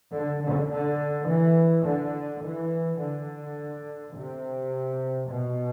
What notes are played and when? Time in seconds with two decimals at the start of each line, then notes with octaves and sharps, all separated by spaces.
0.14 D3
0.43 D3
0.71 D3
1.28 E3
1.86 D3
2.44 E3
3.01 D3
4.15 C3
5.28 B2